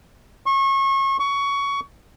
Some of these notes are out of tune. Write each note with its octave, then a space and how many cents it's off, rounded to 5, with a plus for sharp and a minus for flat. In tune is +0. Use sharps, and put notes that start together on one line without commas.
C#6 -30
C#6 +20